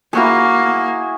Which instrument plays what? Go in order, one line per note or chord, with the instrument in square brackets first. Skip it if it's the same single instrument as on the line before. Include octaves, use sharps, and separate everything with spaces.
[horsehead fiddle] A#3 [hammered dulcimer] E4 F#4 G#4